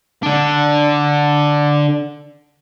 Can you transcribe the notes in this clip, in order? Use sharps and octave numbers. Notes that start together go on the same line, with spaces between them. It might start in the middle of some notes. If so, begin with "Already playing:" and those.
D3 D4